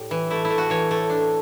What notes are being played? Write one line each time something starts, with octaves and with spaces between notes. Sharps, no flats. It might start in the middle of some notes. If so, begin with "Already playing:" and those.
Already playing: A2 G3
E3
A3 E4
E4
A3
F#4
E3 C#5
A3
D4